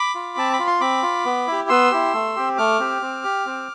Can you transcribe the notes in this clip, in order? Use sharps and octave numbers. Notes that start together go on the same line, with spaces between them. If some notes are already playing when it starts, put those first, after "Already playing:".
Already playing: B5 D6
F4
C4 A5
B5
F4
C6
C4 B5 D6
F4
B3
E4 G4
B3 C6 E6
E4 G4
A3
C4 G4
A3 D6 F6
C4 G4
C4
G4
C4